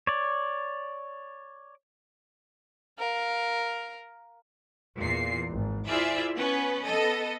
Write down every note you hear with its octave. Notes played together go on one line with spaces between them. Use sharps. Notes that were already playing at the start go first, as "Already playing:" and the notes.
C#5 D5
A#4 F5
E2 A#2 C7
G#1
E4 F4 G#4 C5 D5 E5
B3 C#4 B4
B3 A4 D#5